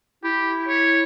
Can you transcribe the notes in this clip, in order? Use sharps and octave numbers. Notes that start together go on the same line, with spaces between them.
E4 G4
C#5